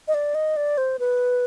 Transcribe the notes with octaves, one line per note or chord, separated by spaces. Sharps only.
D#5
D5
D#5
D5
C5
B4